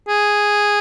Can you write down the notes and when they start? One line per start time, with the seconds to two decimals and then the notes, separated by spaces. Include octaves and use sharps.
0.08 G#4